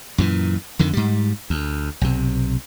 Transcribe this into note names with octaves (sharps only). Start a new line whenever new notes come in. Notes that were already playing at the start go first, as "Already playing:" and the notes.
F#2 A#2 E3
F2 D3 D#3
G#2 G3
D2
B1 C3